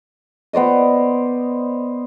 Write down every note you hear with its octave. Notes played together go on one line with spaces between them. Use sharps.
B3 C5 D5 D#5